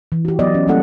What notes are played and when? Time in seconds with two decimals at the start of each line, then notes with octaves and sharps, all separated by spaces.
0.12 E3
0.25 F#4 G4
0.39 F#3 B3 D5 D#5
0.54 C#4
0.67 G3 A#3 C#4 E4 A4 F#5